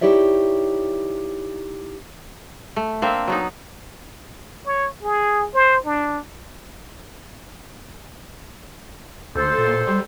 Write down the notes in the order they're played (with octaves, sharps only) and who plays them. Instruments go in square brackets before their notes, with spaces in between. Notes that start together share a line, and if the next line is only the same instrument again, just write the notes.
[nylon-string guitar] D#4 E4 G4 C#5 D5 E5
[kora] A3
A#3 C4 D4 E5
F#3 B3 D#4
[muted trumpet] C#5
G#4
C5
D4
[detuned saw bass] D2 [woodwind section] A4 C5
[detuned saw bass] A#2
G3